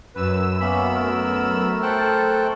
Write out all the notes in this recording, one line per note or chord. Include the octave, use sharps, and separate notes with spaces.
F#2 B4 E6 E7
A#3 B3 C#4 E5 B5
A3 A#4
A4 C5 G5 F#6